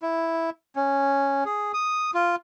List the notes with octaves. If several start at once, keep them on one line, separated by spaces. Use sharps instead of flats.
E4
C#4
G#4
D#6
F4